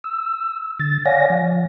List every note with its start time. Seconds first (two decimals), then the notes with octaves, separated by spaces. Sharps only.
0.04 E6
0.80 D3 A6
1.05 C#5 D5 F5 F#5 G#5 A#6
1.30 F3